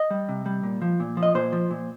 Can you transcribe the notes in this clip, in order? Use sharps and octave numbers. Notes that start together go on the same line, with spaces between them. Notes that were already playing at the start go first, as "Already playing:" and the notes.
Already playing: D#5
G3
C3
G3
A#2
F3
A#2
F3
D#5
A#2 C5
F3
A#2